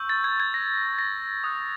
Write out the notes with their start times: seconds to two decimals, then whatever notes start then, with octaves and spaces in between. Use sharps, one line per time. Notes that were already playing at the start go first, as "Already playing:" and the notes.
Already playing: C#6 E6 G6
0.09 A6
0.24 G#6
0.40 G#6
0.54 A#6
0.99 A#6
1.44 D#6 F#6